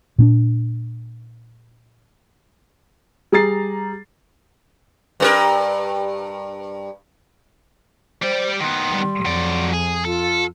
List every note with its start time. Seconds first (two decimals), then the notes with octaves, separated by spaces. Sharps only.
0.18 A#2 C4 D4
3.32 G3 G#4 A#5 A6 C7
5.20 G2 A4 A#4
8.22 G3 C5 D5
8.60 D#3 B3 C6
8.91 G3
9.25 F2 F#3 D5
9.73 G#4
10.05 F4 A4